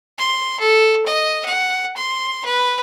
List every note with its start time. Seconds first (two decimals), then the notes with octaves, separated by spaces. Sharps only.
0.18 C6
0.59 A4
1.05 D#5
1.45 F#5
1.96 C6
2.45 B4